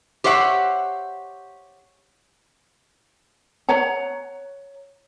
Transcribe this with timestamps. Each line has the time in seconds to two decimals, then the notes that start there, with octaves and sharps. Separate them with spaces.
0.24 G4 C5 C#5 E5 F#5
3.68 C#5 F#5 A#5